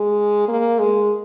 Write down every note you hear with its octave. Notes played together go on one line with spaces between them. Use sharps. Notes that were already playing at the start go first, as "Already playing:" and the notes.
Already playing: G#3
A#3
G#3